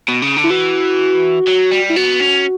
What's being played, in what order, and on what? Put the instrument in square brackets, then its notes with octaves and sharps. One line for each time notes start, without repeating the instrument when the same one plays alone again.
[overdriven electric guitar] B2
C#3
D3
[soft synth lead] E4
[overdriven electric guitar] E3 [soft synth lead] F#4
[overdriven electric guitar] F#3
G3
[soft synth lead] E4
[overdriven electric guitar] B3 [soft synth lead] F#4
[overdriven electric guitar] C#4